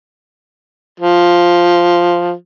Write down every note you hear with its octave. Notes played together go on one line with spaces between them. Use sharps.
F3